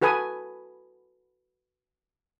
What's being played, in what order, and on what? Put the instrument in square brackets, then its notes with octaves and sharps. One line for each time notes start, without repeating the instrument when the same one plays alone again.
[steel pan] F#4 A4 B4 G#5 B5 D#6